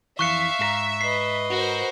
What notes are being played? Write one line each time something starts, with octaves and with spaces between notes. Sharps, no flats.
F2 E3 E5 F5 C#6 F#6 C#7
G#2 G#4 A#5
B4 D#5 C7
F#4 A#4 C5